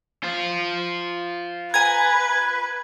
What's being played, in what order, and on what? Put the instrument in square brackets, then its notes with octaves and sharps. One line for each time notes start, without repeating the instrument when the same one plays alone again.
[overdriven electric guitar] F4 C5
[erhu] B4 [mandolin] G#5 A#5 [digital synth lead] G#6